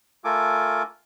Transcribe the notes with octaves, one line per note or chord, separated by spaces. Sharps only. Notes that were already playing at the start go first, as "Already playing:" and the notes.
A3 F4 A4 A#4 G#5 D6